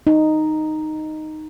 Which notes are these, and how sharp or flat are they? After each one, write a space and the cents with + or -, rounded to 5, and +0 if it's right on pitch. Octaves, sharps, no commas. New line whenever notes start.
D#4 -5